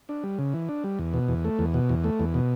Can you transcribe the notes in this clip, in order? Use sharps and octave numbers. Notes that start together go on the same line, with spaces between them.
D4
G3
C#3
E3
D4
G3
E2
B2
E2
A3
E2
B2
E2
A3
E2
B2